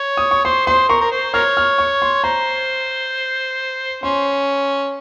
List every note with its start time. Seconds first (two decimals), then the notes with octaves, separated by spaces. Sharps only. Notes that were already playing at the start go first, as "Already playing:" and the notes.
Already playing: C#5
0.17 D#6
0.31 C#6
0.45 C5 C6
0.67 C5 C6
0.89 A#4 C#6
1.01 A#4
1.12 C5
1.34 A#4 C#5 F6
1.57 F6
1.78 C#6
2.02 C6
2.24 C5 A#5
4.03 C#4 C6